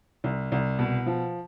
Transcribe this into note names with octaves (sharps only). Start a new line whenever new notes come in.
C2
C2
B2
F3